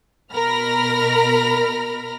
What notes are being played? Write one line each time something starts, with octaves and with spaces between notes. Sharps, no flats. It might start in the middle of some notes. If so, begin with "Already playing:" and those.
B2 A#4 B5 F6 A#6